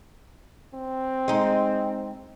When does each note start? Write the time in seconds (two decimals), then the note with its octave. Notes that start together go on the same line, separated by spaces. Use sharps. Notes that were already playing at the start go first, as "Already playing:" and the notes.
0.74 C4
1.28 G#3 D#4